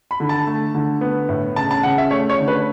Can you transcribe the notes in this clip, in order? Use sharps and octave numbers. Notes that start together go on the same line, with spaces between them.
B5
D3
A5
A3
D3
B3
A2
C#3 A5
A5
C#3 F#5
E5
A3 C#5
C#5
D3
B4